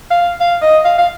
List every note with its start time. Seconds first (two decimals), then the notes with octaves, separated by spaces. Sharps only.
0.10 F5
0.40 F5
0.62 D#5
0.85 F5
0.98 F5